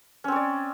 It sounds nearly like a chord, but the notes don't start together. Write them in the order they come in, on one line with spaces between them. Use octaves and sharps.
C#4 C4 C#5 D5